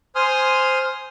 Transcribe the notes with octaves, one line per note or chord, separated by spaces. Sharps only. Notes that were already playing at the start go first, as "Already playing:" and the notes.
C5 G#5 C6 D#6 F6